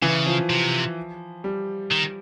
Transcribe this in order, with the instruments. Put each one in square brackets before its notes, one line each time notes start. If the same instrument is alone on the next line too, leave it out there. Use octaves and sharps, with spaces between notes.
[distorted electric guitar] C#3 [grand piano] E3
[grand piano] F3
[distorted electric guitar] C3
[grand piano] G3
[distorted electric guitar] D#3